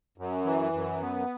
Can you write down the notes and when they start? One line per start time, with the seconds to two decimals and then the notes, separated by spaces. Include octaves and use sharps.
0.18 F#2
0.45 E3
0.73 F#2
1.01 B3